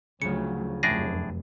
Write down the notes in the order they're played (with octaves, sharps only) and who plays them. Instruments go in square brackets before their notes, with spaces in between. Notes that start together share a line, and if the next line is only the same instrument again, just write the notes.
[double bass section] D2 F#3 [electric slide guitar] C#3 F3 [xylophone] C#7
[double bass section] F1 F#2 [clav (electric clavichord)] A2 D4 G#4 [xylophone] A#6